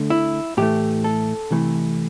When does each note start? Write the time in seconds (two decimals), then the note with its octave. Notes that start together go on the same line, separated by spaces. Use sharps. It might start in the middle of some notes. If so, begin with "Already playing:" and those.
Already playing: D3 A3
0.10 E4
0.57 A2 E3 A3 G4
1.04 A4
1.51 C3 E3 A3